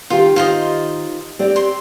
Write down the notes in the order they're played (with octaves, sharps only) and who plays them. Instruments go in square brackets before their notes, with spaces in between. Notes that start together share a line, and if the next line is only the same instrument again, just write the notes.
[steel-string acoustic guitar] D#3 G4 [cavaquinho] F4
[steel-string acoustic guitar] D#3 [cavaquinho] F4 C5 D#5
[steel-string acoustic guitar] C4 G4 D5
[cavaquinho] C6